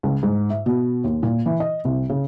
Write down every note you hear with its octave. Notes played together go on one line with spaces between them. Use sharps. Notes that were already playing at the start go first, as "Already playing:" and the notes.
C#2
G#2
E5
B2
D#2
A#2
E3
D#5
C2
C#3